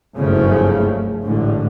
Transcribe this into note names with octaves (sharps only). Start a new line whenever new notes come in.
F#1 C2 G2 C#3 F3 A3
A1 G#2 D3